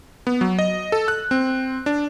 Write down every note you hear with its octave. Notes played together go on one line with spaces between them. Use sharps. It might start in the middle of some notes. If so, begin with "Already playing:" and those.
B3
F#3
D#5
A4
F#6
C4
D4